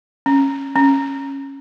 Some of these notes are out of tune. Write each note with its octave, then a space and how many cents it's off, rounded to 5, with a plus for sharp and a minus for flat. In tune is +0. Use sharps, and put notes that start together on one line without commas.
C#4 -15
C#4 -15